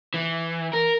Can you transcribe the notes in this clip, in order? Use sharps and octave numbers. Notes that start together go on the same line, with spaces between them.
E3
A#4